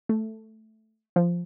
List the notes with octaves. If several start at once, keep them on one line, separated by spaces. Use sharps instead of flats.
A3
F3